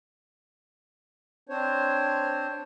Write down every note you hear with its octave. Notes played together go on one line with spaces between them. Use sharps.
C4 D4 C5 C#5